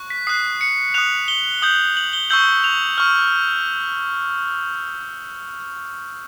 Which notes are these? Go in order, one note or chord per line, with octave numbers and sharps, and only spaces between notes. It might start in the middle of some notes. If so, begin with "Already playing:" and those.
Already playing: C#6 F#6
B6
D#6 F#6 C7
C#7
D#6 F#6 F7
G7
D#6 G6 F#7
F#7
G7
C#6 E6 G6 F#7
F7
C#6 F6